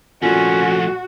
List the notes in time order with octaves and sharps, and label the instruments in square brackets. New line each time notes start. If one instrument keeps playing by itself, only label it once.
[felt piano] A#2 [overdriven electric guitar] F3 A3 [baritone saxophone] C#4 [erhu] F#4